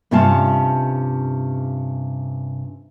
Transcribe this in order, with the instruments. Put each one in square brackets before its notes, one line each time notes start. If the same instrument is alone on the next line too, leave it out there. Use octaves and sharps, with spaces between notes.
[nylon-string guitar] G2 C3 C#4 F4 F5 A5